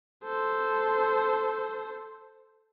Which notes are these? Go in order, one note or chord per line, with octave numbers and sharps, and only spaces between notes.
A4 C5